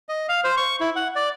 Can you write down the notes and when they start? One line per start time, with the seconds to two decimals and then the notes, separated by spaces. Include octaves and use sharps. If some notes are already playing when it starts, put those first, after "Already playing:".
0.09 D#5
0.29 F5
0.44 C5
0.57 C#6
0.81 E4
0.96 F#5
1.16 D5